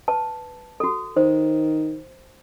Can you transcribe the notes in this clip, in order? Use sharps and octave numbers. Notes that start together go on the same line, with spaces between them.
B4 A5
F#4 A4
D#3 C5